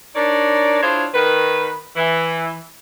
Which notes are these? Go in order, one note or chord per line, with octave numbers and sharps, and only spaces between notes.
D4 D#4 A#4 C#5 D5
D4 E4 F4 G#4 C5 C#5
D#3 B4
E3